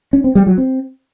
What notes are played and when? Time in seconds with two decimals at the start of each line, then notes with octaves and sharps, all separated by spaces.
0.13 C#4
0.24 C4
0.35 G3
0.47 F#3
0.58 C4